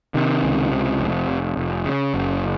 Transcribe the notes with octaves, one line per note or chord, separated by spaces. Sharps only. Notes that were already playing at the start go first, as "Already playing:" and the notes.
C3 D#3
C#2
C3
F1
F1
F1
C#3
F#1